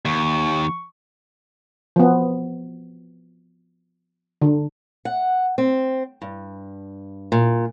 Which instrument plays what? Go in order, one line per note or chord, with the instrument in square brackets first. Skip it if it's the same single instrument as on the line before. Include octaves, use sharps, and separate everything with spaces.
[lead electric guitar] D#2 [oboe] C#6
[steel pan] F3 B3
D3
[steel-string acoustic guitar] F#5
C4
G2
A#2